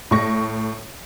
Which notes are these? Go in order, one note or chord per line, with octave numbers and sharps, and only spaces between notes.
A2 C#6 A#6